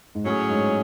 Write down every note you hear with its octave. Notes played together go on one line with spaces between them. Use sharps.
G#2
A2 F#3 C#4 G#4
G#2